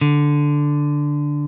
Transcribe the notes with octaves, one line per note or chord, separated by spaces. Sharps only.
D3